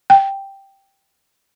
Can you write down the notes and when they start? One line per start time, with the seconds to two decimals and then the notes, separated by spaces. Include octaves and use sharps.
0.10 G5